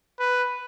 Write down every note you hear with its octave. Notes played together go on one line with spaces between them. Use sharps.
B4